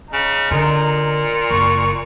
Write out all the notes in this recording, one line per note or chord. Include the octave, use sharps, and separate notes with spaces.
C#3 D#4
A#2 D3
F#1 C#6